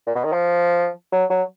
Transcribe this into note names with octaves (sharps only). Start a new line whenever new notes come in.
A#2
B2
D#3
F3
F#3
F#3